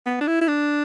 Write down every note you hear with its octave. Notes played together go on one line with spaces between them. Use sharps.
B3
D4
E4
E4
D4